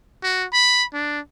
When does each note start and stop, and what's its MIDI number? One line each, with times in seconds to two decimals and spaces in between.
0.23 0.45 66
0.53 0.84 83
0.94 1.19 62